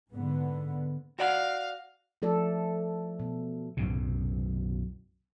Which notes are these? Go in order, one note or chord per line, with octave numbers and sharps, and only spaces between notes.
G#2 D3 B3
F#4 D5 F5 F#5
F3 A3 A4 D5
B2
B1 F#2 A2 C3